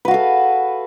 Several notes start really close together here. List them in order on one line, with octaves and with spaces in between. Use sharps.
B4 F#4 F5 A4